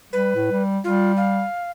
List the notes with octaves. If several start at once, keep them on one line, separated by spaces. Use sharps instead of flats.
G3 B4
A2
G3
G3 F4
F5